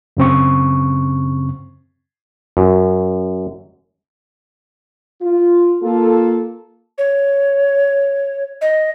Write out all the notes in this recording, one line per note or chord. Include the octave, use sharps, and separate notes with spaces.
F#2 C#3 C4 C#6
F#2
F4
A#3 F4 A4
C#5
D#5